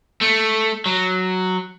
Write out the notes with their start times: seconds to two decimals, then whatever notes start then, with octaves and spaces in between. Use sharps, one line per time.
0.21 A3
0.86 F#3